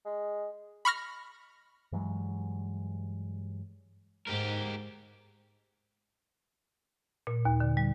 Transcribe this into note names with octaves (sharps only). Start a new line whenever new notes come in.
G#3
B5 C#6 F6 A#6
G2 E3 F#3 G#3
G#2 G4 A#4
A#2
D#2
D3
G3